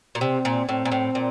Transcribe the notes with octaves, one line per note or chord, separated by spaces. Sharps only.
A#2
C3 C4
A#2
A2 C4
A#2
A2
A#2